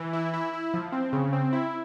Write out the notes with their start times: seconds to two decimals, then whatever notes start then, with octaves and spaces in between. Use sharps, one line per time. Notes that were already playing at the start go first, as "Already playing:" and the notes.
Already playing: E3
0.13 E4
0.34 E4
0.53 E4
0.74 F3
0.92 C4
1.13 C#3
1.33 C4
1.53 E4